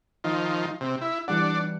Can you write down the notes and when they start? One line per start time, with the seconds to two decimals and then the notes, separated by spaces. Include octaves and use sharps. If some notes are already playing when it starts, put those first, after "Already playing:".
0.24 D#3 F3
0.81 C3
1.01 E4
1.28 E3 G3 D4 F#5